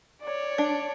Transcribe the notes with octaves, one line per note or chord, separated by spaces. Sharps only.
C#5 D5
D4